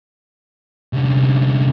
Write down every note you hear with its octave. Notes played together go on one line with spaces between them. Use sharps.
C2 D3